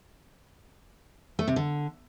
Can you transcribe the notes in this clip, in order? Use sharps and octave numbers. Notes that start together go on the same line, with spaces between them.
A3
C3
D3